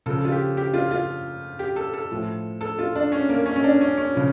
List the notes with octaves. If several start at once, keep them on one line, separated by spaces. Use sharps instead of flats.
C#3 F3 A4
F4
G4
G4
F4
F4
G4
A4
A4
A2 F3
A4
F4
D4
C#4
A#3
C#4
C#4
D4
C#4
C#4
C#3 F3